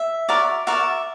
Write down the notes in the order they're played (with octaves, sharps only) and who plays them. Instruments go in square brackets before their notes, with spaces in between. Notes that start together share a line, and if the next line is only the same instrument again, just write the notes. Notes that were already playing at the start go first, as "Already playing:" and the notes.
Already playing: [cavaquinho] E5
F#4 A#4 D5
F#4 A#4 D5 E5